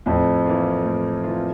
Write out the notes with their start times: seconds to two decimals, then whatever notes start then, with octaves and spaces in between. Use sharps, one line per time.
0.06 F2 A2
0.46 E3 A#3 F4
0.84 A2
1.24 E3 A#3 F4